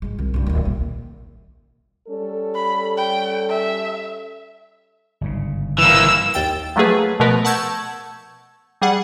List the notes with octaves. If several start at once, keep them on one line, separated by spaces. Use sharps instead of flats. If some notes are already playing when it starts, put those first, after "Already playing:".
G#2 G#3
C2 D#3
C#2 G2
D1 D#3
A#1
G3 C#4 A4
B5
G5
E5
G1 G#2 C#3
E3 A#3 E6
D#2 G5 A6
F3 F#3 A3 A#3 G#4 B4
B2 F3 A3 B3 A#4 B4
F#5 A5 C#6 E6 G6 G#6
G3 G#4 F#5